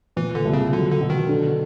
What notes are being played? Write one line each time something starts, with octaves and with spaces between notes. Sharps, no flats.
A#2 E3
D3
C2
C#3
D3 F#3
D3
B2
D#3
D3